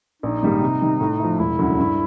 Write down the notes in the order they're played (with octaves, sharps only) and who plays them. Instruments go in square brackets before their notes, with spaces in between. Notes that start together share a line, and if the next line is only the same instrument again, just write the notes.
[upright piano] A#1 [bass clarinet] D#4
[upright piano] G#2 D#3 G3 A#3
C3
D#3 G3
A2
F3 A3
[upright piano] E1 [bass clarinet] E4
[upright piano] D2 C#3 F#3
G2